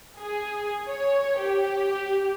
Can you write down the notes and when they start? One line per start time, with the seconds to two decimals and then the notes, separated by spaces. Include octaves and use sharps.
0.18 G#4
0.87 C#5
1.39 G4